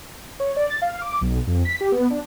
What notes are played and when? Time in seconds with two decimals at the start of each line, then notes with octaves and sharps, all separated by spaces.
0.40 C#5
0.56 D5
0.70 A6
0.82 F5
1.02 D6
1.21 B1
1.47 F2
1.65 B6
1.81 G4
1.92 B3
2.10 D4